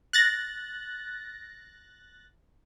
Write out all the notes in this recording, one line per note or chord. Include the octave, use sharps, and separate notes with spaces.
F#6 A6 A#6